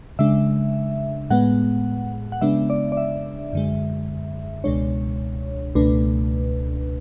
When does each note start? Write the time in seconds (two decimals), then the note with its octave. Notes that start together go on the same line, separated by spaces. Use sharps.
0.19 C#3 G#3 D4 E5
1.30 A2 G#3 B3 F#5
2.32 F#5
2.41 C#3 G#3 B3 D4 E5
2.70 D5
2.92 D5
2.97 E5
3.53 F#2 D3 G#3
4.64 C#2 B2 G#3 D4 C#5
5.75 C#2 B2 A3 D4 B4